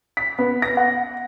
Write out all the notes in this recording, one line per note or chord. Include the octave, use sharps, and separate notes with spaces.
B6
B3
A#6
F#5